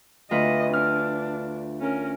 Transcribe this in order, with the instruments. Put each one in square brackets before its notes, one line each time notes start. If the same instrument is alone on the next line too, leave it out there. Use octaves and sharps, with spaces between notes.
[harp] D2 F4 B4 [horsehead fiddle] D#5
[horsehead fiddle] D4 [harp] F6
[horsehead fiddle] C#4 A#4